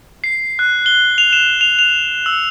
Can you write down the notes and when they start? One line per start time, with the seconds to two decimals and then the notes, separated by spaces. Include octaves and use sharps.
0.24 C7
0.59 F#6
0.86 G7
1.18 F7
1.33 E7
1.61 F7
1.79 F7
2.26 E6